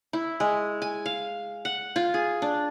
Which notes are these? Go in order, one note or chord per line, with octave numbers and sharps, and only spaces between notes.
E4
G#3
G#5
F5
F#5
F4
G#4
D4